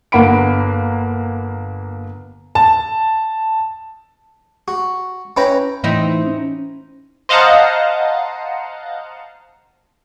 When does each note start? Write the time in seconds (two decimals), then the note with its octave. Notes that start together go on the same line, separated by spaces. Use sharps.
0.12 G1 A#3 F#5 B5 D7
2.55 A5
4.68 F#4
5.37 C#4 E4 B4 G5 A#5
5.84 A2 E3 C4 D#4 E4
6.26 C#4
7.29 C5 D#5 F5 F#5 A5 A#5